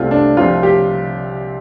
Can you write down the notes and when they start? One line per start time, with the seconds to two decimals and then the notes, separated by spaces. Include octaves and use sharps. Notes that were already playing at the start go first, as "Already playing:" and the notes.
Already playing: C2 C3 A3 C4 F4
0.11 D4
0.37 C2 C3 F3 C4 F4
0.63 G4